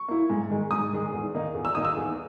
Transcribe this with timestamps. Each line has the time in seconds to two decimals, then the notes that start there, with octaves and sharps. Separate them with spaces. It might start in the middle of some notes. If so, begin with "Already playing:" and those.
Already playing: C#6
0.08 A#3 E4
0.30 G#2
0.50 D#3 G#3
0.71 G#2 D#6
0.93 D#3 G#3
1.13 E2
1.34 D#3 A#3 D#4
1.54 E2
1.65 E6
1.75 D#3 A#3 D#4 D#6
1.85 E6
1.96 E2